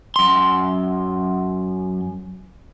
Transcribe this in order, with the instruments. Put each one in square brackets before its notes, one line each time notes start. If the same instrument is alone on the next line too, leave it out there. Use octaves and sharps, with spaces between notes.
[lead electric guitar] F#2 C6